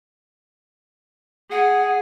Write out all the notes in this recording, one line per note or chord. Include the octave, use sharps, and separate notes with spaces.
G#4 F#5